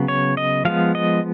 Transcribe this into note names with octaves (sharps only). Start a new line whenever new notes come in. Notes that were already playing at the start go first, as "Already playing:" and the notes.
Already playing: C#3 F#3 B3
C#5
D#5
F3 G#3 B3 F5
D#5